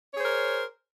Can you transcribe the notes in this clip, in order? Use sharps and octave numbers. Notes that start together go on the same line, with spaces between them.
G#4 A#4 C5 C#5